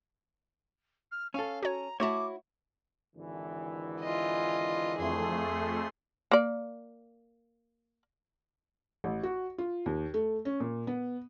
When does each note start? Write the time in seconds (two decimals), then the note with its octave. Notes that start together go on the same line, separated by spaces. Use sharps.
1.11 F6
1.34 C#4 A4 F5
1.63 F#4 C#5 A#5
2.00 A3 E4 F#4 C#5 A5 D6
3.16 G#1 D3 E3
4.00 F4 D#5
4.98 F2 A3 G#4 C6
6.31 A#3 D5
9.04 A1
9.23 F#4
9.58 F4
9.86 D#2
10.14 A3
10.45 C#4
10.60 A#2
10.87 B3